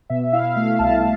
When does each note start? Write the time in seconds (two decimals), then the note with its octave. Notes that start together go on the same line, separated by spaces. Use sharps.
0.10 B2 E5
0.23 E5
0.33 E4 F5
0.56 A3 F5
0.79 C2 A5